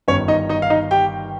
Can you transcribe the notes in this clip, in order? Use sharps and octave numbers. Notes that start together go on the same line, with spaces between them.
G1 G2 D#3 C#4 C#5
D#4 D#5
D#4 D#5
F5
D#4 D#5
G4 G5